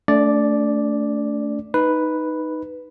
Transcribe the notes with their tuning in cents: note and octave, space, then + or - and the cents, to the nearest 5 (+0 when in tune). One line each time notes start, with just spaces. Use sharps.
A3 +0 D4 -35 D5 +0
D#4 +0 B4 +0